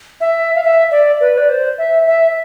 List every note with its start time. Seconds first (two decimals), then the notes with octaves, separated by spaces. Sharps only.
0.21 E5
0.55 F5
0.64 E5
0.91 D5
1.21 B4
1.38 D5
1.49 C5
1.78 E5
2.07 E5